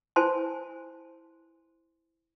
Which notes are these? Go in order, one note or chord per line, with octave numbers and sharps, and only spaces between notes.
E4 B4 C5 G#5 A5 C6